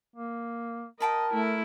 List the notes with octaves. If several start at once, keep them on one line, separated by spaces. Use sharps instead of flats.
A#3
A#4 D#5 G5 A5 B5
A3 E4